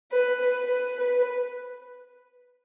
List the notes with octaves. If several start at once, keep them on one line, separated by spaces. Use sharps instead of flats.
B4
B4
B4
B4